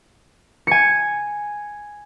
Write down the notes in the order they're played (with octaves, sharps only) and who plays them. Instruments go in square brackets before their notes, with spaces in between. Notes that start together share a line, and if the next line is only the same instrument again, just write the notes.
[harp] G#5 C#7